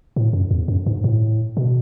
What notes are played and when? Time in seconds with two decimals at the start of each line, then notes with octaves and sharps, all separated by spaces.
0.16 A2
0.33 F#2
0.51 E2
0.68 F#2
0.86 G#2
1.04 A2
1.57 B2